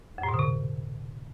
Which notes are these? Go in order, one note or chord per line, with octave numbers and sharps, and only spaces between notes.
F2
A2
B2
D3
C3